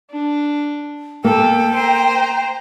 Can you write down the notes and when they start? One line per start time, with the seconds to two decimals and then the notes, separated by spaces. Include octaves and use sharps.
0.11 D4
1.24 A#3 A4 G5
1.74 C5 A#5